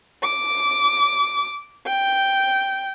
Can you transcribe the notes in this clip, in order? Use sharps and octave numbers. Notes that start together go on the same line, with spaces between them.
D6
G5